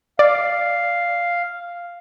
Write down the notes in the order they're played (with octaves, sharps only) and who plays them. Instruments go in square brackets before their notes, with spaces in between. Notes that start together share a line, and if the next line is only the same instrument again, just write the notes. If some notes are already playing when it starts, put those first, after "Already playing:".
[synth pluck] D5 [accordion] F5